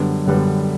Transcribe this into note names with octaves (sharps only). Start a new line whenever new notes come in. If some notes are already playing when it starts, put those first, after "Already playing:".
Already playing: F#2 D3 G3 B3
F#2 D3 G3 B3